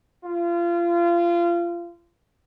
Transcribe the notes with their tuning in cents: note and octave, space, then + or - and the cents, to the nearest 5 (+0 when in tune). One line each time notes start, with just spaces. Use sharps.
F4 -25